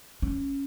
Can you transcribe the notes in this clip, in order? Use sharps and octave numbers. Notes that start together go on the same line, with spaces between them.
C#4